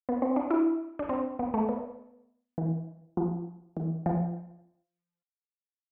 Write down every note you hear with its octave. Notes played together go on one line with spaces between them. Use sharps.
B3
C4
D4
E4
D4
C4
B3
A3
B3
E3
F3
E3
F3